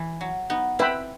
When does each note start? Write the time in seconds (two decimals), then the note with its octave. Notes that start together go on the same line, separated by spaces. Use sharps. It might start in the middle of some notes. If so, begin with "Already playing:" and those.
Already playing: E3
0.21 F#3
0.50 B3 D#4
0.79 C4 E4 B4 E5 G5 B5